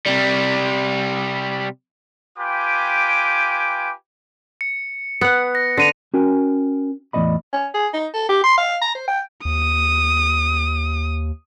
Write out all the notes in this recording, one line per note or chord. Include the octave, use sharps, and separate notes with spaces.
C3 G3
F4 G4 B4 G5 G#5 D6
C#7
B3 F#5 C#7
A#6
D3 A#6 D#7 F7
C#4 F#4 A#4 G5 G#5
E2 A2 G#3 D5 D#5 B5
C#4
G#4
D#4
A4
G4
C6
F5
A#5
C5
G5
D#2 D#6